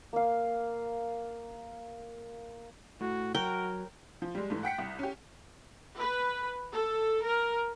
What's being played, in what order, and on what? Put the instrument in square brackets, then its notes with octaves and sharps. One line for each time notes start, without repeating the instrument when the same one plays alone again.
[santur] A#3 F5
[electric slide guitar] A2 [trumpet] F#4
[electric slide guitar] F#3 [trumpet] F#4 [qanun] A#4 G5
[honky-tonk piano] F3
G3 G#3
G#2 E3 A3
F#5 G5 B6 C#7
C2
C#4 G4
[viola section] B4
A4
A#4